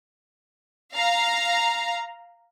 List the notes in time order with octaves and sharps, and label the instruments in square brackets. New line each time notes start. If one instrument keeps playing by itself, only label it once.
[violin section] F5 A#5